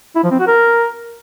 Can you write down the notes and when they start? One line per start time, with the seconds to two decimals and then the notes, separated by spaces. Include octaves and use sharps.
0.15 E4
0.23 F3
0.31 C4
0.39 F#4
0.47 A#4